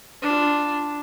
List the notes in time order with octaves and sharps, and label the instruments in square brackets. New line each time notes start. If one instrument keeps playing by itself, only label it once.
[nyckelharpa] D4 F4